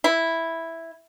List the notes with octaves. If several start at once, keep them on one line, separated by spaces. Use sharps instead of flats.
E4